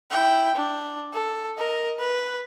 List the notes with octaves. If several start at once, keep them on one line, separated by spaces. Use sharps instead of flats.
E4 G5
D4
A4
A#4 D#5
B4